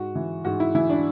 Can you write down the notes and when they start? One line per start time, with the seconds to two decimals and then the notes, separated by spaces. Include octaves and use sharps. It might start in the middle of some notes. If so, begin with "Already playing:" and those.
Already playing: G#2 F#4
0.15 E3
0.45 G#2 F#4
0.60 E4
0.75 E3 E4
0.90 D4